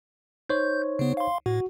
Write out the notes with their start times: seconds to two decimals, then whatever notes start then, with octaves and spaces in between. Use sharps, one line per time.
0.49 D#4 C5 C#5 G6
0.99 C#3 B3
1.17 F5 C6
1.46 A2 F#4